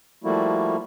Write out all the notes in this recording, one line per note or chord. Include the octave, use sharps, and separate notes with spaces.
F3 G3 A3 A#3 E4 F#4